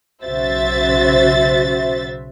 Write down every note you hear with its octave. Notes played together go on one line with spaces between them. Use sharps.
B1 C#3 F#4 C5 E5 A6